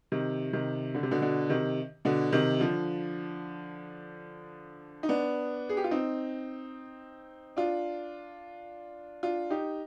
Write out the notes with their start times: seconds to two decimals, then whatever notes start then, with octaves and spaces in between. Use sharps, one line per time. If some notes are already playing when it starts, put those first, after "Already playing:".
0.12 C3 D#3
0.53 C3 D#3
0.95 D3
1.03 C3
1.11 B2 D3
1.21 B2 D3
1.50 C3 D#3
2.05 B2 D3
2.32 C3 D#3
2.60 D3 F3
5.03 D#4
5.09 B3 D4
5.69 G#4
5.77 G4
5.84 F4
5.91 C4 D#4
7.57 D4 F4
9.23 D4 F4
9.50 D#4 G4